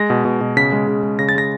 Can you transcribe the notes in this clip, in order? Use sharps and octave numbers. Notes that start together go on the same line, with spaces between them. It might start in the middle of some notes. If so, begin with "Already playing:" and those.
Already playing: G#3 A#6
B2
B2
B2
C#3 B6
G#3
C#3
G#3
C#3 A#6
A6
G#3 A#6